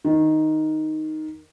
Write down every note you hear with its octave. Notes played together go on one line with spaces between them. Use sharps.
D#3